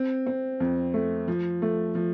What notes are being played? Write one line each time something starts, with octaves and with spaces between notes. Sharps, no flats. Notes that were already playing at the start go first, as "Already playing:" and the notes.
Already playing: C4
C4
F2
A3
F3
A3
F3